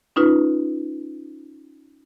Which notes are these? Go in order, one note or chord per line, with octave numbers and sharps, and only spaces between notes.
C#4 D#4 F4 B4